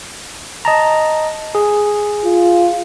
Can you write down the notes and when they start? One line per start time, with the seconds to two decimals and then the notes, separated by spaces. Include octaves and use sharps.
0.65 D#5 A5 A#5
1.55 G#4
2.25 F4